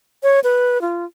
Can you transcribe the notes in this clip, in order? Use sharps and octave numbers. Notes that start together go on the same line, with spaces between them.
C#5
B4
F4